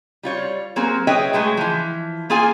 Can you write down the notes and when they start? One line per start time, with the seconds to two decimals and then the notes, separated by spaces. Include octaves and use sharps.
0.23 G3 F4 C#5
0.76 F#3 A#3 C4 G#4
1.07 G#4 B4 C#5 D#5 E5 G5
1.33 F#3 G#3 A3 G#4
1.57 E3 F3
2.30 A#3 F4 G#4 F5 G#5